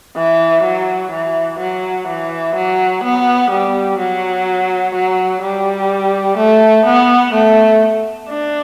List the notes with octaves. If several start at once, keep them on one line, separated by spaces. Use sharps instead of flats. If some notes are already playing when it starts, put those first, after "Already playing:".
E3
F#3
E3
F#3
E3
F#3
B3
G3
F#3
F#3
G3
A3
B3
A3
D4